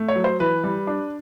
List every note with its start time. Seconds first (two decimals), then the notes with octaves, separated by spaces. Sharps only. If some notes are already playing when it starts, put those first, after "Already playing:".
Already playing: A3
0.08 C#5
0.15 F#3
0.24 C5
0.39 E3 B4
0.64 G3
0.87 D4